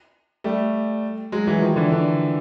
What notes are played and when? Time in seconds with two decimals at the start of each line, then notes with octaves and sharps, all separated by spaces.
0.44 G3 A3
1.32 F#3 G#3
1.47 E3 F#3
1.61 D#3 F3
1.76 D3 E3
1.92 D3